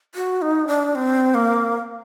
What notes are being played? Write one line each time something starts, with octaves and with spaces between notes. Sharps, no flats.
F#4
D#4
D4
C4
A#3